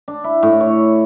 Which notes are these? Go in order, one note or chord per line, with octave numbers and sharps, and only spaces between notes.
D4
E4
A2
C#5